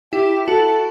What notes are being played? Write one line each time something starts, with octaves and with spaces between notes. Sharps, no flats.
E4 G4
F#4 A4